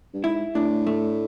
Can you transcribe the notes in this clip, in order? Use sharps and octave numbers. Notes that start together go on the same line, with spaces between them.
G2
G#2 E4
A2 D4
A3